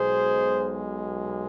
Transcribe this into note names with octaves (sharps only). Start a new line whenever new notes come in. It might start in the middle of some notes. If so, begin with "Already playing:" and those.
Already playing: B1 B2 G#3 G#4 C5